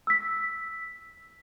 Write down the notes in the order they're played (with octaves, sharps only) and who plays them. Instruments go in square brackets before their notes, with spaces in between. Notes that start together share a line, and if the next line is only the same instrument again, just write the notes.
[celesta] E6 B6